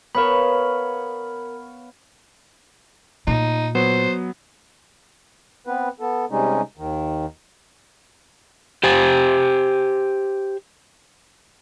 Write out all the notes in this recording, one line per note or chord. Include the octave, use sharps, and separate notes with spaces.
B3 A#4 C#5 F5 B5
A#2 D#4
F#3 B3 C5
B3 C4 B4
B3 A4
C3 G3 G#3 C#4 D#4
D#2 D#3
G4 C5 G#5